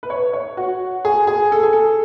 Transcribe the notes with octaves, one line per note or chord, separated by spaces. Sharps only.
B4
C#5
C#5
F#4
G#4
G#4
A4
G#4
A4